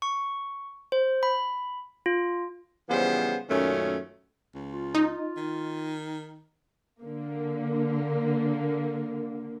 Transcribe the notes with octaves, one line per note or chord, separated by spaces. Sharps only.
C#6
C5
B5
F4
C#3 E3 F3 G3 B3 C5
F#2 A#2 D#3 A3 C#4
C#2
F4
D#4
D#3
D3 A#3